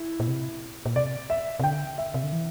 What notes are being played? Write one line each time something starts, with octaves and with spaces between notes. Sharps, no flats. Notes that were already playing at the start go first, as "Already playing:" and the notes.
Already playing: E4
A#2
C3
A#2
C3 D5
E5
C3
D3 G5
E5
C3
D3
E3